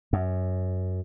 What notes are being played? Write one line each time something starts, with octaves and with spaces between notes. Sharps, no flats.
F#2